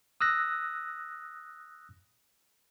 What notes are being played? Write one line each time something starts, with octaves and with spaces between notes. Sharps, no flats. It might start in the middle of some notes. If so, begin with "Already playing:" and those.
D#6 E6 F#6 A#6